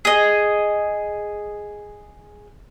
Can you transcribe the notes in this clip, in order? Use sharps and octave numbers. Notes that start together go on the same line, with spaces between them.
G#4 D#5